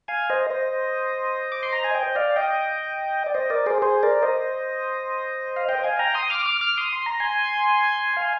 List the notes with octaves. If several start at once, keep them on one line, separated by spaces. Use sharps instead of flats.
F5 G#5
C5 D#5
C5 D#5
D6
C6
A#5
G#5
D#5 G5
D5 F5
D#5 G5
D5
C5 D#5
A#4 D5
G#4 C5
G#4 C5
A#4 D5
C5 D#5
F5
D#5 G5
F5 G#5
G5 A#5
C6 D#6
D6 F6
D6 F6
D6 F6
C6 D#6
C6
A#5
G#5 C6
F5 G#5